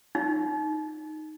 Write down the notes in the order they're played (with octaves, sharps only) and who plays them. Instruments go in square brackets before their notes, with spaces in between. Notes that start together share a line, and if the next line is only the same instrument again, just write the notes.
[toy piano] D#4